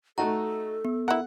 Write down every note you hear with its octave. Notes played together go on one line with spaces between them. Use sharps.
A3 D#4 F#4 A4 A#5
B3
E4 A#4 F#5